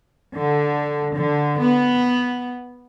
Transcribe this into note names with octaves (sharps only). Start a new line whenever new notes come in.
D3
D3
B3